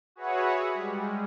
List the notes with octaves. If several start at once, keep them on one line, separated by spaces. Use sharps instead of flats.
F#4 G#4 B4 C#5 E5 F#5
G3 G#3